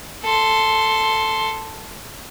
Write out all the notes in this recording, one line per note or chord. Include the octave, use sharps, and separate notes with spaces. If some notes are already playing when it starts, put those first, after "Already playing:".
A4 C6